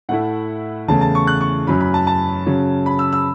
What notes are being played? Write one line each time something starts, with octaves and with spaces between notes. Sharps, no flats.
A2 A3 E4 F#5
E2 C#3 A3 A5
A5
C#6
F#6
C#6
F#2 F#3 C#4 B5
B5
A5
A5
C#3 F#3 C#4
B5
E6
E6